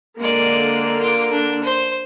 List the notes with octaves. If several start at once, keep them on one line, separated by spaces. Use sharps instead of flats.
D3 G#3 A#3 D5
F4 D6
D4
C5